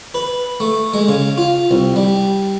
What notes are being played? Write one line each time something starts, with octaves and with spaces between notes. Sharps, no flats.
B4
A3
G#3
C#3
F4
C2
G3